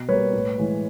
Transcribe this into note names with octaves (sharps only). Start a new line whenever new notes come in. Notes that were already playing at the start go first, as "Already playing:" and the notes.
Already playing: B2
G3 A#3 B4 C#5
A2
E3 G#3